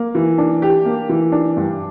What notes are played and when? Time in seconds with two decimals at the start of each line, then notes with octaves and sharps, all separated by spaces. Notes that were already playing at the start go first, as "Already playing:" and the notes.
Already playing: A#3
0.15 E3
0.38 D4
0.62 G4
0.86 A#3
1.09 E3
1.32 D4
1.57 G2